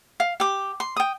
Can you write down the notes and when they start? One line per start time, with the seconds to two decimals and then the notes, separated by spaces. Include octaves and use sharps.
0.20 F5
0.40 G4 D6
0.80 C6
0.96 G5 D#6